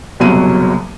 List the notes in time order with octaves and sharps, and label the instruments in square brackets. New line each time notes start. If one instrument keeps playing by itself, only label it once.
[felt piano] F#1 C2 B2 F#3 D#7